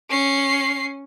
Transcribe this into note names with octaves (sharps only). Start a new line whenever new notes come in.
C#4 C7